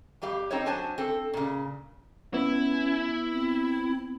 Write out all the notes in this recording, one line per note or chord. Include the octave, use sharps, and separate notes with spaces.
F2 G3 G4 F5
C4 D#4 A4 C5 C#5
F#3 D4 C5 G#5 A5
C4 A4
A#2 C#3
B3 C#4 E4
C4